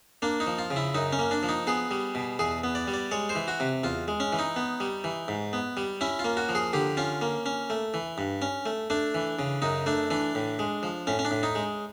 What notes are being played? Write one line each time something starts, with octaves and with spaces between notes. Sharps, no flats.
A#3 D4
D#4
F3
F4
C#3
E4
F#2 D#4
C#4
A#3
D4
F3
D#4
B3 G#4
G3
B2
E2 G#4
B3
D5
G3
D5
G#3 C#5
C5
E3
F#4
C3
E2 F4
G#3
C#4
E3
D#4
B3
G3
E3
G#2
B3
G3
C#4 E4
F4
A#3
F#4
F3
G#4
D3 G4
C#4 F4
A#3
C#4
A3
E3
G2
C#4
A3
A3 D4
E3
C#3
F#2 D#4
A3 D4
E3 D4
A2
G#3
F3
A2 C#4
C#4
D4
A2
D#4
G#3